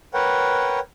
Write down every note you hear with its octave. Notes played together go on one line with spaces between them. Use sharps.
A#4 B4 C#5 F#5 G5